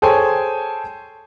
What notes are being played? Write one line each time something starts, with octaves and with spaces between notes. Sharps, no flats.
G#4 A4 C5 C#5 G5 G#5